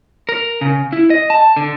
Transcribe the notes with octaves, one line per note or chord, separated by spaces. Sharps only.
A#4
C#3
E4
D#5
A5
D3